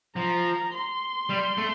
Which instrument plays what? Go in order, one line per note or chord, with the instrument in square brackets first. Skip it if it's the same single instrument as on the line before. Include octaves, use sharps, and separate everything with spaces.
[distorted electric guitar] F3 [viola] A#5
[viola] C6
[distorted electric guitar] G3
A3